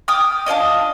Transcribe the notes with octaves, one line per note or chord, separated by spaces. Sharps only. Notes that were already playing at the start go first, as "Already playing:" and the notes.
G5 D6 D#6 F6
D4 F4 D5 D#5